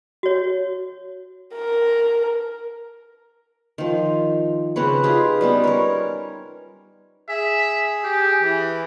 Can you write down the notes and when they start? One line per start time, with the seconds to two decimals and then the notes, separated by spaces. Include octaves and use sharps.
0.23 F#4 C#5
1.54 A#4
3.78 D#3 F3
4.76 C#3 C4 B4 C#5
5.03 D#4 F4 G4 G#4
5.41 G3 B3 C#4
5.64 A#4 C#5
7.29 G#4 E5
8.04 G4
8.43 E3